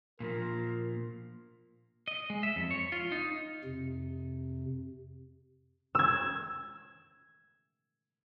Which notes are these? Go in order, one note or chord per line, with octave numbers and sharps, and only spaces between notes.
A#2 D#3 F3 A#4
D#5
G#3
E5
F2
C#5
F4
D#4
F2 C3
E6 G#6